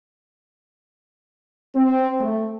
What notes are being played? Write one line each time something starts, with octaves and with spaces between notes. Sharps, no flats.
C4
A3